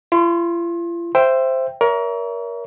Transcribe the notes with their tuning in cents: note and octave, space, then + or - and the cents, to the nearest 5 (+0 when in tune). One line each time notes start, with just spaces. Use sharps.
F4 -45 C6 +30
C5 +0 E5 +15 G5 +0
A#4 +20 C#5 +35 E5 +0